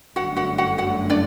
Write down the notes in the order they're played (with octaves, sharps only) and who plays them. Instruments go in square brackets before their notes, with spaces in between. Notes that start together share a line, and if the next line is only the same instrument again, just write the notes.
[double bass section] G1 F#2 D3 A3 [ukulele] F#4 F#5
[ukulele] F#4 F#5
F#4 F#5
F#4 F#5
D4 D5